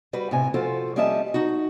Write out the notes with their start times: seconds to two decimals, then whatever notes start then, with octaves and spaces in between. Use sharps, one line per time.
0.13 G3 F#4 B4
0.31 A2 C3 G#5
0.54 F3 F4 F#4 A4 C5
0.96 G3 A#3 C#4 D#5 E5 A5
1.34 D#4 F#4